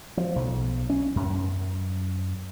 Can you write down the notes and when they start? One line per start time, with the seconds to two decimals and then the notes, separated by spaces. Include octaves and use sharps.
0.17 F3
0.36 B1
0.90 C#4
1.16 F#2